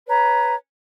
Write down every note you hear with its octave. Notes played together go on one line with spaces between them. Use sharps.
B4 C#5 A#5